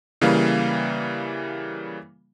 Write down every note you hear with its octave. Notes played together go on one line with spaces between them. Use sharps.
C#3 E3 G3 A#3 E4 F5